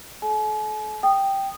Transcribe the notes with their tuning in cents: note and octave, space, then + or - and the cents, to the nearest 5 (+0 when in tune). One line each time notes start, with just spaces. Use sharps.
A4 -35 G#5 +45
G5 +0 D#6 -15